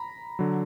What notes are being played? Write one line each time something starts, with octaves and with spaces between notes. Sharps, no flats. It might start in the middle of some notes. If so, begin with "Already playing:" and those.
Already playing: A#5 B5
D3 F#3